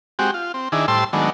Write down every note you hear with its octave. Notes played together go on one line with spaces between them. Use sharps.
G#3 C4 F#4 G4
F4
C4
D#3 D4 E4 G#4
A2 G3 C5 A5 C6 E6
D#3 F#3 G#3 A3 B3 D4